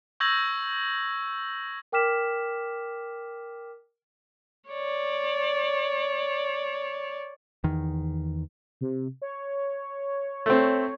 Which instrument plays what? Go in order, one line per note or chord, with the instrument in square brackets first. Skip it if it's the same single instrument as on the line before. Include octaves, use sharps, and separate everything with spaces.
[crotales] C#6 E6 G6 G#6 A#6 F#7
[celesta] A#4 G5 D6 F6 B6 E7
[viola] C#5 D5
[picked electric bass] E2 D#3
[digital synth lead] C3
C#5
[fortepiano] A3 C4